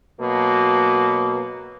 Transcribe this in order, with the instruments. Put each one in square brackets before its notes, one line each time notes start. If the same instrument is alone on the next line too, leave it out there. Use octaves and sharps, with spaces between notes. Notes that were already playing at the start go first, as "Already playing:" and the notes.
[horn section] B2 F#3 A#3